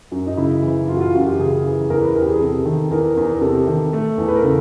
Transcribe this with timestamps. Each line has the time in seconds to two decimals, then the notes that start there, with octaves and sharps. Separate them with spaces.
0.12 F#2
0.27 D#4
0.37 C#3 E4
0.63 E3
0.88 F#2 F4
0.96 F#4
1.01 F4
1.14 F#2 F#4
1.26 G4
1.39 C#3 G#4
1.64 E3
1.90 E2 A#4
2.02 B4
2.15 E2 A#4
2.21 G4
2.28 G#4
2.41 C3 A4
2.66 D#3
2.91 E2 A#4
3.17 E2
3.35 A#4
3.41 C3 A4
3.67 D#3
3.93 A3
4.18 E2
4.28 B4
4.36 A#4
4.44 C#3 A4